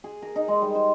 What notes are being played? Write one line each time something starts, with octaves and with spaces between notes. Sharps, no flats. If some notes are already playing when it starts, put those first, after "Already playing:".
G#4
A#4
D#4
G#3
G3
C5